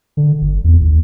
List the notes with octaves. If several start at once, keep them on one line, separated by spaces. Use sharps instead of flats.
D3
G1
E2
D#2